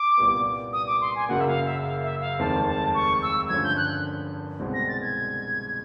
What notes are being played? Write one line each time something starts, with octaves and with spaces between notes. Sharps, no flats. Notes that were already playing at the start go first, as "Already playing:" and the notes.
Already playing: D6
C2 A#2 G3 B3
D#6
D6
C6
G#5
F#1 F#2 C#3 F#3 A#3 F#5
E5
F5
E5
F5
E5
F5
F1 D#2 D#3 G#3 C4 A5
A5
C#6
E6
G2 D3 F3 A3 C#4 G#6
G6
F#6
C2 B2 G#3 C4
A#6
A6
G#6